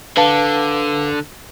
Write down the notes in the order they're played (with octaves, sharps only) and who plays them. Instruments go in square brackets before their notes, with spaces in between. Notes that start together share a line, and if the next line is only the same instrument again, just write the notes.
[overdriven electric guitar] D3 [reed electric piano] B4 F5 A5